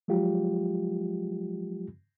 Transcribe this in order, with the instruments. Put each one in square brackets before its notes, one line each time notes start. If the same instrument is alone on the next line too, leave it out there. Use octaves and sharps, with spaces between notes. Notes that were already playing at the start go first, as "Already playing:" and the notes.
[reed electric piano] F3 F#3 G#3 F4 G4